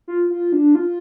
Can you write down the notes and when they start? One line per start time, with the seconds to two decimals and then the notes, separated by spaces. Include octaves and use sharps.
0.08 F4
0.30 F4
0.52 D4
0.75 F4